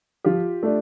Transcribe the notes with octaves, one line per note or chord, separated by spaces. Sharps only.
F3 F4 G4
A3 D4